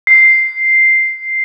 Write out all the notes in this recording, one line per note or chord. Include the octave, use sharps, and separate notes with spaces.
C7